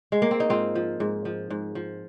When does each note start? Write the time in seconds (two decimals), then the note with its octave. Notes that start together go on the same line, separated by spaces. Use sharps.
0.12 G#3
0.22 A#3
0.31 C4
0.40 D#4
0.50 G#2 C4 F4
0.75 F3
1.00 G#2
1.25 F3
1.50 G#2
1.75 F3